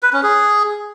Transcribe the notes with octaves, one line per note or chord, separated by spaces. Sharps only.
B4
C#4
G#4